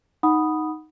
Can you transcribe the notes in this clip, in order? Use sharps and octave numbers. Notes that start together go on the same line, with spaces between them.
D#4 F#5 B5 D#6